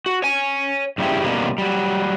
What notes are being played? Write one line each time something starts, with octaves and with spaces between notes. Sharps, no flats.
F#4
C#5 G#5
G2 C#3 G3 D#4 E4 G4
B2 D3 G3 A#3 C#4
F#3 G3